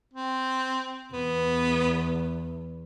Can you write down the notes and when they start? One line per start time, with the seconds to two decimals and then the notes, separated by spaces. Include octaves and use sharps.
0.14 C4
1.13 E2 B3